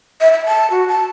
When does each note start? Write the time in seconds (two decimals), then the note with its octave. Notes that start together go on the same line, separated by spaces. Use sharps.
0.21 E5
0.33 E5
0.46 A5
0.71 F#4
0.88 A5